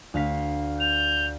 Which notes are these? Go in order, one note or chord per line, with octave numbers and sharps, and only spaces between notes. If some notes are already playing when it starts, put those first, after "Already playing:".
D2 F5 B6
G6 F7